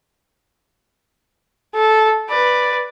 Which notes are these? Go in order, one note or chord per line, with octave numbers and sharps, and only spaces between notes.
A4
B4 D5